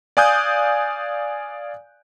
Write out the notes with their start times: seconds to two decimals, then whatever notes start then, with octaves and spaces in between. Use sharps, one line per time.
0.17 D5 F5 G#5 D#6 F#6 G6